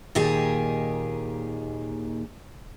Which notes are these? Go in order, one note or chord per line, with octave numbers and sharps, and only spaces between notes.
D#2 A#2 D#3 G4 G#4